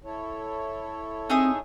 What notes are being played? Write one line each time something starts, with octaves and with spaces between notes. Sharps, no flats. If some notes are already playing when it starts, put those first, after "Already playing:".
E4 A4 C#5
C4 D#4 G#4 E5